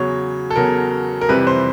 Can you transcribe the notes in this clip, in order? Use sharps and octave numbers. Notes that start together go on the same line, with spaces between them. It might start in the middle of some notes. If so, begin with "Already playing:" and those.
Already playing: E2 C#3 F#3 C#5
A4
E2 C#3 F#3 A#4
A#4
F2 C3 E3 G3 B4
C5